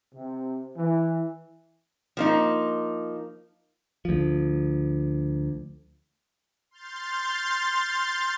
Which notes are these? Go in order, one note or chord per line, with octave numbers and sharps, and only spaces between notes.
C3
E3
F3 A#3 D#4
D2 F3
C6 F6 G6 A6